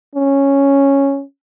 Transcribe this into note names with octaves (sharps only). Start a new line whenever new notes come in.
C#4